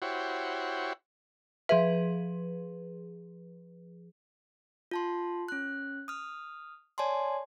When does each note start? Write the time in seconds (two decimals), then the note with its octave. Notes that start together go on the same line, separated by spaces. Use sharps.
0.02 E4 F#4 G4 C5 C#5
1.69 F3 G#4 B4 E5
4.91 F4 A5 C6
5.48 C#4 F#6
6.08 D#6 F6
6.98 C#5 D5 G#5 A5 C6